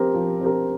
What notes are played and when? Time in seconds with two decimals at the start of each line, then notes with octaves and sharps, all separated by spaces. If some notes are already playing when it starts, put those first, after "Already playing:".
Already playing: F3 C4 G4 A#4
0.14 F3
0.41 C4 G4 A#4